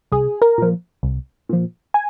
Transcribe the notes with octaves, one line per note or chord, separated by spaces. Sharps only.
C2 G#4
A#4
A#2 F3
C2
A#2 F3
G#5